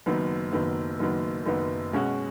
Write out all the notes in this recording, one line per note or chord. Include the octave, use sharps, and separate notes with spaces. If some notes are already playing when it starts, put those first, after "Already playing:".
F#1 F#2 D#3 B3
F#1 F#2 D#3 B3
F#1 F#2 D#3 B3
F#1 F#2 D#3 B3
B2 G#3 C#4 F#4